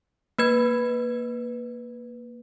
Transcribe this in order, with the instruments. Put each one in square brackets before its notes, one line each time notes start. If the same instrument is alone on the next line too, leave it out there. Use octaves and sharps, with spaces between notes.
[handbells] A#3 B4 G#6